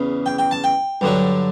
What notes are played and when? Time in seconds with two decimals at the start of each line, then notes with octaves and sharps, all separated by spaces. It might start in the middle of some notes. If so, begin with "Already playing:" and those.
Already playing: E2 C#3 E3
0.26 G5
0.38 G5
0.51 A5
0.64 G5
1.01 G2 D3 F#3